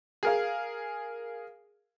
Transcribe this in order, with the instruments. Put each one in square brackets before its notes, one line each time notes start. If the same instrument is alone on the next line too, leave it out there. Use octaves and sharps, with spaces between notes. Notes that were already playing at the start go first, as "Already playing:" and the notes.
[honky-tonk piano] G#4 A#4 F5